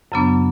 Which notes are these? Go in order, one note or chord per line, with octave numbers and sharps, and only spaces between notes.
F#2 C#3 F#3 B3 D4